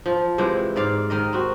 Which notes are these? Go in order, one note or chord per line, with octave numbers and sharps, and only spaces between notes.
F3
C3 E3 G#3 G5
G#2 D5 F5
D#3 A#4 D#5
C4 F#4